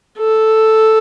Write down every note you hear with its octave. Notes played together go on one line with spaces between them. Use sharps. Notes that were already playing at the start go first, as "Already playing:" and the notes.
A4